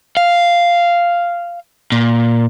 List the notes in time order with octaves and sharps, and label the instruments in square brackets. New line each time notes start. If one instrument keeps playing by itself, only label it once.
[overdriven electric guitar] F5
A#2